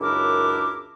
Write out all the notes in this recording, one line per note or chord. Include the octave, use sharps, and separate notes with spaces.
C#2 F#2 D4 E4 A#4 D6